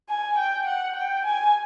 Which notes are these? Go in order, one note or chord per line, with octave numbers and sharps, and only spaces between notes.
G#5
G5
F#5
G5
G#5